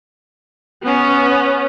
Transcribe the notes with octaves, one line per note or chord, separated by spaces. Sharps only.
B3 C#4